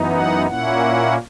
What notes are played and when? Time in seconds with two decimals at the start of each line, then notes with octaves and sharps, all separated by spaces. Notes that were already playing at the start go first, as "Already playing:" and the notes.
Already playing: F#2 E3 B3 D#4
0.12 F#5
0.46 A#2 A#3 C#4 E4 F#5